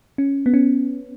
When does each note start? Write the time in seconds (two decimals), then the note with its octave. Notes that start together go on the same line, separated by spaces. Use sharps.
0.18 C#4
0.46 B3
0.54 C#4